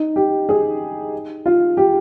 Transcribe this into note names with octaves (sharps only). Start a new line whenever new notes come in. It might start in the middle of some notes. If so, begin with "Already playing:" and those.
Already playing: D#4
G4
G#4
F4
G4